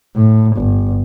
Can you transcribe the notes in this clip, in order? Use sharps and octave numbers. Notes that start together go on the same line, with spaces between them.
A2
G1